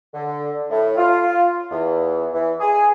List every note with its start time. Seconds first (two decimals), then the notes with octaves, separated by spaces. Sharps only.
0.13 D3
0.69 A2
0.97 F4
1.70 E2
2.33 E3
2.60 G#4